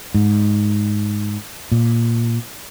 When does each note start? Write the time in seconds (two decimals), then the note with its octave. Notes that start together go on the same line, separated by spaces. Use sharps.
0.14 G#2
1.72 A#2